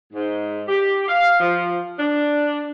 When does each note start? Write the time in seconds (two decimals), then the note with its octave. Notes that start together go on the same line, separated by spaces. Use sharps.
0.13 G#2
0.68 G4
1.08 F5
1.40 F3
1.99 D4